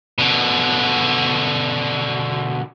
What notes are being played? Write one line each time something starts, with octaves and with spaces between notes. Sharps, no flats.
B2 D3